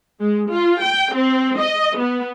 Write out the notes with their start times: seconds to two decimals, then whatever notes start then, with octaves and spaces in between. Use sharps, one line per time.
0.20 G#3
0.50 F4
0.81 G5
1.14 C4
1.58 D#5
1.97 B3